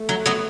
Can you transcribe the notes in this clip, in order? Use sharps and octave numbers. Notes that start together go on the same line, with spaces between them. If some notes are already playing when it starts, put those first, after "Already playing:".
Already playing: A3
F#3
F#3 B3